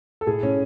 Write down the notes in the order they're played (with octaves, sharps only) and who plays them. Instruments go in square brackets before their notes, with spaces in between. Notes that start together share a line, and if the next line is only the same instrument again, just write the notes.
[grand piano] A4
A2 G#4
A2 C#4